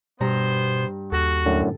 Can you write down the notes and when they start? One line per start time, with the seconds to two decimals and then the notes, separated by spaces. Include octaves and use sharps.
0.20 G2 B2 B3 C5 A#5
1.12 D#2 F#4 A4
1.46 F#2 A2 D3